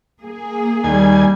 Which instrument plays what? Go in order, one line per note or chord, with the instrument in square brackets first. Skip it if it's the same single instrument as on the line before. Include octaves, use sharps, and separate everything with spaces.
[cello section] A#3 G#4
[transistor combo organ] D#2 G#5 [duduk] G3